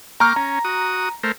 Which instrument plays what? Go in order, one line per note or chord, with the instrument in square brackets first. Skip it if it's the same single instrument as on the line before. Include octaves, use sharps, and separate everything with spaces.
[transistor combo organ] A#3 G5 D6 [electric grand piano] A#5 C#6 F6
[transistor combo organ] C#4 [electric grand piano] A#5
[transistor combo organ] F#4 D#6
A3 A#4 C5